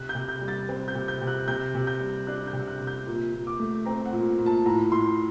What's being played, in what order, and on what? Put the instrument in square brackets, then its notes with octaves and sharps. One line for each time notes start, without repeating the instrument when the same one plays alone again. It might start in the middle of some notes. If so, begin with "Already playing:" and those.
Already playing: [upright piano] C3 F#6
G6
C3
G6
G3
A6
C4
G6
C3
G6
C3
F#6
C3 G6
C3
G6
G3
D4 F#6
G6
C3
F#6
C3
G6
A#2
A#2
D6
A3
C4 A#5
F#5
A#2
A#2
A5
A2 A#5
A2 C6